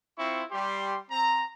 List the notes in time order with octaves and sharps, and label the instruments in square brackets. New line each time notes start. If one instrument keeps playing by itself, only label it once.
[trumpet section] C4 E4 F4 C#6
G3 G4 C6
C4 A#5